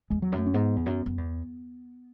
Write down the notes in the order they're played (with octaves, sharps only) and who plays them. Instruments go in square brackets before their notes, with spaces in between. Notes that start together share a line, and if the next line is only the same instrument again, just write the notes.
[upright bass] E2 [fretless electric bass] G#3
[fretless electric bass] F#3
[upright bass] F#2
[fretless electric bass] A3
C#4
[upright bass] G#2 [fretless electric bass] B3
[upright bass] E2
F#2
F#2
E2